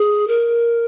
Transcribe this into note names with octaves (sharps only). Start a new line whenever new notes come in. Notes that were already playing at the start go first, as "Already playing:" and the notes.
Already playing: G#4
A#4